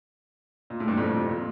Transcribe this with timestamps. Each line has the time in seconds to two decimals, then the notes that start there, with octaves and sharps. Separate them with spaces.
0.70 A#2
0.80 A2
0.88 G2
0.97 F2 A2
1.19 C3
1.29 A#2